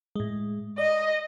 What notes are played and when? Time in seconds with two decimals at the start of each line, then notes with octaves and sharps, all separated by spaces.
0.16 A2 G#3
0.78 D5 D#5